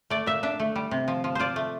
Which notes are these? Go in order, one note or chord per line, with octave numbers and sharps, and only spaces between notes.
A3 D5
A#2 E5
D4 E5
A3
G3
C3
F3
F3
F4 C5 D5
A3